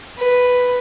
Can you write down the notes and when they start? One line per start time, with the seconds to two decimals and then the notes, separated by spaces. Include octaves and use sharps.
0.18 B4